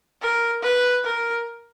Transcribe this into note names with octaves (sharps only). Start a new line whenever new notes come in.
A#4
B4
A#4